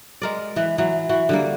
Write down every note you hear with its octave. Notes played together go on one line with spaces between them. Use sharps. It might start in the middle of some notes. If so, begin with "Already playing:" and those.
G#3 A#4 D5
E3 B4
E3 F#3
E3 F#4
D3 G3 A#3